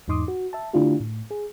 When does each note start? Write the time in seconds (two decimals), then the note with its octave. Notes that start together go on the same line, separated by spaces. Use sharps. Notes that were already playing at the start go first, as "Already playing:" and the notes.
0.08 E2 G#2 D#4 C6 D6 D#6
0.28 F#4
0.53 E5 A5
0.73 D3 A3 D4 E4 F4 G4
1.00 A2
1.31 G#4